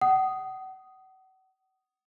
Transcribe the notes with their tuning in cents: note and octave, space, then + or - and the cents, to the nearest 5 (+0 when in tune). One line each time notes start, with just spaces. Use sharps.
F#5 +35 D#6 +0